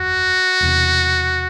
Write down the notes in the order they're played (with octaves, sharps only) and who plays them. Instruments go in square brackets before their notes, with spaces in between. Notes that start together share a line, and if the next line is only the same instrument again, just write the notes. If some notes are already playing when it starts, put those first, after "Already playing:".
Already playing: [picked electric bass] F#1 E2 [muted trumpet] F#4
[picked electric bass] E1 E2 C3